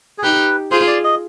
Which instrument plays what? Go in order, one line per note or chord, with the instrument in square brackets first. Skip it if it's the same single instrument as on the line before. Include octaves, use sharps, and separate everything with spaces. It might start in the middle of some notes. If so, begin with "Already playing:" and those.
[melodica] G#4
[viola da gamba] D#4 G4 [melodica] B4
[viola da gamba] F4 G#4 [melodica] C5
[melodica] D5
D#5